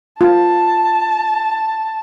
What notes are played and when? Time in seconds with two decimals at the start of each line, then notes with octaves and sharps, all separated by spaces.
0.21 F4 A5